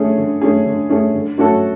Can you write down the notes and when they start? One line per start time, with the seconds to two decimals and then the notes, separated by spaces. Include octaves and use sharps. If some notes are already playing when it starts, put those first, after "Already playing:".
Already playing: D3 A3 C#4 G#4
0.18 D3
0.42 A3 C#4 G#4
0.66 D3
0.89 A3 C#4 G#4
1.14 D3
1.38 A3 C#4 F#4 A4